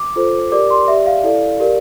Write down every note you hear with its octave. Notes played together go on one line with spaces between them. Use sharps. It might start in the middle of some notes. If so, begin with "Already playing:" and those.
Already playing: D6
F4 A4 C5
G4 A#4 D5 D6
C6
G4 D5 E5
F5
E4 A4 D5
G4 A#4 D5